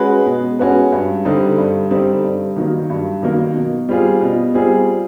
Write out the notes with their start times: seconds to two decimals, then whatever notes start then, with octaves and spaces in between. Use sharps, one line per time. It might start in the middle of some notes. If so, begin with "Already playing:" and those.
Already playing: G#3 C#4 F#4 B4
0.26 B2
0.59 G#3 C#4 F#4 B4
0.92 G2
1.25 D3 G3 C4 D#4
1.58 G2
1.91 D3 G3 C4 D#4
2.24 G2
2.56 D#3 F#3 A#3
2.90 G2
3.23 D#3 F#3 A#3
3.55 B2
3.89 G3 C4 F4 G#4
4.21 B2
4.54 G3 C4 F4 G#4